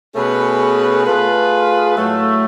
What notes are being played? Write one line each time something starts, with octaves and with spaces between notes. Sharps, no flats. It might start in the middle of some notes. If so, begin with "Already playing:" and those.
B2 A3 C#4 G#4 B4
A3 F4 G#4 B4
A2 F#3 A3